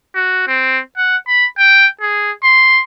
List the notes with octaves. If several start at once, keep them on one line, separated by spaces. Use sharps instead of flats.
F#4
C4
F#5
B5
G5
G#4
C6